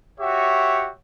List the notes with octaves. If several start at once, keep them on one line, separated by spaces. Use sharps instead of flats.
F#4 G4 C#5 E5